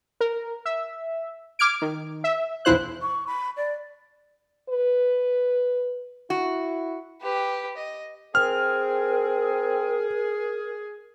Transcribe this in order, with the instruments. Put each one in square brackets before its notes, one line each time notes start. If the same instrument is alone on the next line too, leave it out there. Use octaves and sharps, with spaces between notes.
[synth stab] A#4
E5
D6 F6 G#6 D7
D#3
E5
B1 E2 F3 E4 C5 F#6
[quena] C#6
B5
D5
[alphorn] B4
[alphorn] E4 [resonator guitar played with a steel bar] F#4
[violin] G4 B4
D#5
[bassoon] C4 [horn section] G#4 [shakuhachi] A#4 [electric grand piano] F6